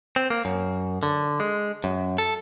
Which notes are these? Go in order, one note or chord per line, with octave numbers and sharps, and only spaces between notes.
C4
A#3
F#2
D3
G#3
F#2
A4